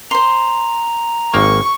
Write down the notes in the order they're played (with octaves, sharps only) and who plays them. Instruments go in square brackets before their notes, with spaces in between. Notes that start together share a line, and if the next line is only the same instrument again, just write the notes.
[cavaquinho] C5 C6 [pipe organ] A#5
[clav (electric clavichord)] G#1 A#3 [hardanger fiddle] C#6